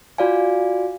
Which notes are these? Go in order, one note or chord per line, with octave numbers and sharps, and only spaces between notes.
F4 F#4 D5 F5 G#5